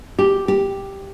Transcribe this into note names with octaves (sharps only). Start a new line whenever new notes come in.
G4
G4